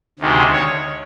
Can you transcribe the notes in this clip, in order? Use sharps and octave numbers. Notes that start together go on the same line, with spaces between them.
D2 C3 D#3 G#3
C#5